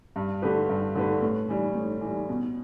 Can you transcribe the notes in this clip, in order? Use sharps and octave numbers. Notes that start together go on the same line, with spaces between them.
G2
D3 A3 G4 B4
G2
D3 A3 G4 B4
A2
E3 G3
A2
E3
G3
B2